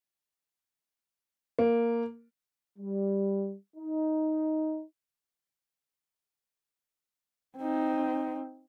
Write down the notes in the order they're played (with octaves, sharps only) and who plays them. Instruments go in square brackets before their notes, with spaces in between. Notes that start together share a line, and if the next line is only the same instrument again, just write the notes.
[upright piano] A#3
[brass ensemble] G3
D#4
[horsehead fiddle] C4 D#4